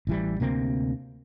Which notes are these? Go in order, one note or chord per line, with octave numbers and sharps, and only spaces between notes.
A1 E3 G3
D2 C3 A#3 C4